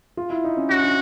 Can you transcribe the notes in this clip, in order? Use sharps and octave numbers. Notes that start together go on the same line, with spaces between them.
F4
E4
D#4
C#4
C#4 F#4
D4